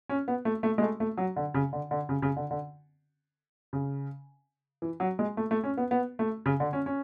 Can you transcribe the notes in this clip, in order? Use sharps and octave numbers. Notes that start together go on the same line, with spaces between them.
C#4
B3
A3
A3
G#3
A3
A3
F#3
D3
C#3
D3
D3
C#3
C#3
D3
D3
C#3
E3
F#3
G#3
A3
A3
C#4
B3
B3
A3
C#3
D3
C#4
C#4